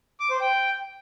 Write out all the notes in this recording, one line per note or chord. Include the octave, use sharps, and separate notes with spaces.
D6
C5
G5